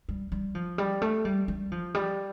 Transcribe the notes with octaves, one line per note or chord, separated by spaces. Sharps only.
G3
G3
F3
G3
A3
G3
G3
F3
G3